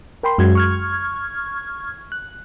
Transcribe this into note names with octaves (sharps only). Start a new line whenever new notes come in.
A#4 G5 B5 C6
F#2 G#3 F#4 G#6
C#6 F6 G#6
F#6